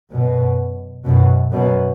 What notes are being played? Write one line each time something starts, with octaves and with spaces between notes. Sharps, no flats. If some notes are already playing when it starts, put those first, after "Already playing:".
F#2 B2
F#2 B2
F#2 B2